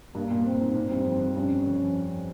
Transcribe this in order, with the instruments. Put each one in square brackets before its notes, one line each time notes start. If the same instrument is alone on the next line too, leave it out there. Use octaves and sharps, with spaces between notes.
[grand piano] G2 [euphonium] A#3
[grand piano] A#2
[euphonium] C4
[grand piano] G#2
[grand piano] G#2 [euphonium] C4
[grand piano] G2
F2
F2
[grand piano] G2 [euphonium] C#4
[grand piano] F2